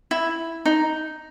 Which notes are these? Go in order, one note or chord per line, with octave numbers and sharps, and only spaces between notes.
E4
D#4